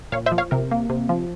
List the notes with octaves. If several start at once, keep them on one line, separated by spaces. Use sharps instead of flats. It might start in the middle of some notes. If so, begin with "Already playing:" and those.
A#2 C#5 F5
C5 E5
F3
C#5 F5
C3 A#4
A#3
C3
F3